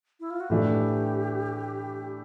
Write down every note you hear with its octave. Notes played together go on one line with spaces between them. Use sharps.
E4
F4
F#4
A2 E3 A3 D4 G4